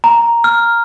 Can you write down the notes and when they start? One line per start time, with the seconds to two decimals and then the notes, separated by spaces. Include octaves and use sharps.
0.04 A#5
0.44 F6